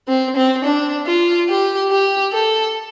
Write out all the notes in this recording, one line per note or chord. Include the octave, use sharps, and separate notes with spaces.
C4
C4
D4
F4
G4
G4
A4